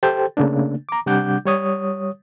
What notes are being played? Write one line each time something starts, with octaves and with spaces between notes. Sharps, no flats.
G4 A4 C5 G5
C#3 A3 A#3 D4
A#5 D6
C3 G3 D4 F#5 D6 G6
G3 C#5 D#6